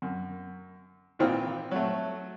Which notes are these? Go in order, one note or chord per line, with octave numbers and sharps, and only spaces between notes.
F#2
G#1 A#2 E3 C4 G5 F6
F#3 A3